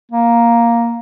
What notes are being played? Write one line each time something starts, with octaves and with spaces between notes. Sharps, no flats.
A#3